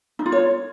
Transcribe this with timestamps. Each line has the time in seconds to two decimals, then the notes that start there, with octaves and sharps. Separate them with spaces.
0.19 D#4
0.26 F4
0.32 C#5